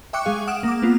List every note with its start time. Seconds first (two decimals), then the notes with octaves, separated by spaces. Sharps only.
0.13 E5 G5 C#6 D6 F#6 C#7
0.25 G#3 G#4 F5
0.47 F#5 D#6 F6 D7 E7
0.63 A#3 D6
0.82 A#3 B3 F4